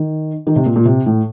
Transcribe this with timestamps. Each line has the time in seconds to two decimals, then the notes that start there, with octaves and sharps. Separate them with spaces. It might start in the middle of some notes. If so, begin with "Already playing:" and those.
Already playing: D#3
0.47 D#3
0.56 C3
0.66 A#2
0.76 A#2
0.85 C3
1.06 A2